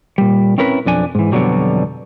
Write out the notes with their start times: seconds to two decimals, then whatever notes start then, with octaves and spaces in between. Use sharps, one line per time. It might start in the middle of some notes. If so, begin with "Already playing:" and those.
0.18 A#2 G3
0.58 C4 C#4 E4 A#4 B4
0.85 B1 F2 D4 G#5
1.15 G#2 E3
1.32 F2 B2 D3 D#3 F#3 G3